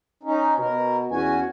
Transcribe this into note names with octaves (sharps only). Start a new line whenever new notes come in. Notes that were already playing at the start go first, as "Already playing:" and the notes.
C#4 D#4
B2 A#4
E2 C#4 F#4 G#5